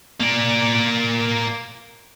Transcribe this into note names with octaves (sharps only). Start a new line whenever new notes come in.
A#3 D5